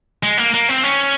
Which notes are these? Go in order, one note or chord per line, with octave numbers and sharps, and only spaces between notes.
G#3
A#3
A#3
C4
C#4